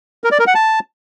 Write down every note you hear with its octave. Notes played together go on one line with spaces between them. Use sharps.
A#4
D5
A#4
F#5
A5